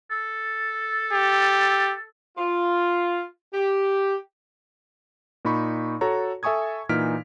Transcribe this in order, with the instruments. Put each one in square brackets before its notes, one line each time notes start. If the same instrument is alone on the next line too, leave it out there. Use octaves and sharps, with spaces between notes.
[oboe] A4
[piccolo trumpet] G4
[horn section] F4
G4
[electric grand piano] A#2 D#4 B5 C#6
F#4 A4 C#5 A#5
A4 E5 G#5 C#6 D#6 G#6
A#2 E3 D#4 F6 B6 D7